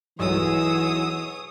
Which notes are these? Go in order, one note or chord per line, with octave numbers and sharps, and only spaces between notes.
B1 E3 F#3 G#4 C#5 D#6 E6